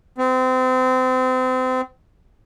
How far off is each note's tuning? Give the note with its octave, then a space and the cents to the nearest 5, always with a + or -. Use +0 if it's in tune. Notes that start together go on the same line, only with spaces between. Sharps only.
C4 -30